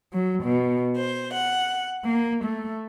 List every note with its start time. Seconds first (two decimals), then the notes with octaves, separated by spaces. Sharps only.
0.13 F#3
0.44 B2
0.95 C5
1.34 F#5
2.05 A#3
2.44 A3